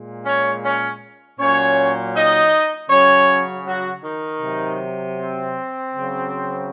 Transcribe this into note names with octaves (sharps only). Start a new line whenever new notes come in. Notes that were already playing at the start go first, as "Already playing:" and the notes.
Already playing: A#2 G#3
C#4 C#5
C#4 C#5
A#2 F#3 C#4 C#5
D#4 D#5
C#3 F#3 C#4 C#5
F#3 F#4
D#3 D#4
C3 F#3
C4
C#3 F#3